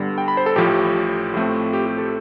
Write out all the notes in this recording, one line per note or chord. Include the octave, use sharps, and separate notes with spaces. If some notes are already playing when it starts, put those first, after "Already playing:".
Already playing: G2 D3 G3 B3
G5
B5
C5
A4
A1 A2 F3 G4
A2 F3 A3 C4
G4
G4
A4